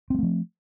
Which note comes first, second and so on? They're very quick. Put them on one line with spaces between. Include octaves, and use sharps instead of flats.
C4 G#3 A3 F3